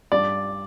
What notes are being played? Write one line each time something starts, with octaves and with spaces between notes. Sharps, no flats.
G2 D5